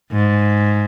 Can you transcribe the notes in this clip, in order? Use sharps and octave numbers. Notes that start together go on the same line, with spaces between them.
G#2